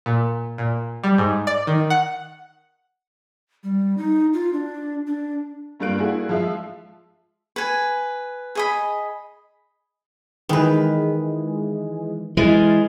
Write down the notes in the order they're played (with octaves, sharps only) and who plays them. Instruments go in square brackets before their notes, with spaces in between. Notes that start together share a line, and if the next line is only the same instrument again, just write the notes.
[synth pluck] A#2
A#2
G3
G#2
D5
D#3
F#5
[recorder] G3
D#4
F4
D4
D4
[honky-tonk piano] G2 G3 A#3 F4 F#6 D7
A#3 D4 E4 F#4 G#4
F3 G#3 F4 E5
[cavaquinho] B4 G#5
G#4 D#5 B5
[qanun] D#3 B4 [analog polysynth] E3 G#3 G#4
[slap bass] E3 [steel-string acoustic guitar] G#3 [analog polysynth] F6 A6 C7